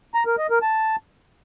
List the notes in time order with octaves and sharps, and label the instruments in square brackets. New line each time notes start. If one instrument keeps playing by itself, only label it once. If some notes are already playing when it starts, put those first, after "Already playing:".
[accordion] A#5
A#4
D#5
A#4
A5